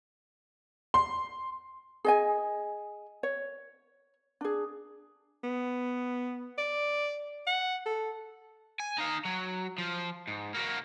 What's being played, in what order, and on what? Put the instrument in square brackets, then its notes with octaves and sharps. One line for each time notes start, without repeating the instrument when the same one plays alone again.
[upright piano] C6
[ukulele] G#4 D#5 G#5
C#5
D4 G#4
[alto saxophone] B3
D5
F#5
A4
[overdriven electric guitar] G#5
D#4 F5
F#3
F3
G#2
A#3 F#4